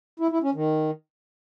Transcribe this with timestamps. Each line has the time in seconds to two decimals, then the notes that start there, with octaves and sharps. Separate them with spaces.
0.20 E4
0.31 E4
0.43 C#4
0.54 D#3